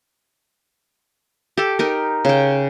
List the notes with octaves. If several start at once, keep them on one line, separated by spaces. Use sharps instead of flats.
G4 A4
D#4 G4 A#4
C#3 G5